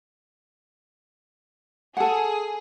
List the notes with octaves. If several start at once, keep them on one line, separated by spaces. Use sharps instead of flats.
G#4 A4 F#5